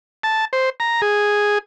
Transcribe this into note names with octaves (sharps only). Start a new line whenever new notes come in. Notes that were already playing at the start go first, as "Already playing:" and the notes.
A5
C5
A#5
G#4